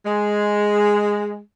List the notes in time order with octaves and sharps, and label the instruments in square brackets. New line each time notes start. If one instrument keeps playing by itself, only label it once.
[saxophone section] G#3